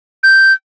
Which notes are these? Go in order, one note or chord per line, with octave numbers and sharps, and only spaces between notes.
G6